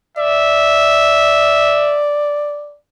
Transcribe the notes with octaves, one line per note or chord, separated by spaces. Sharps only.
D5 E5